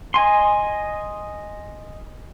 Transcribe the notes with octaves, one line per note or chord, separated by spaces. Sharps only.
D#5 G#5 C6